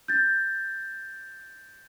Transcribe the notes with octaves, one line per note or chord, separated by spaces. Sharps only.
G6 A6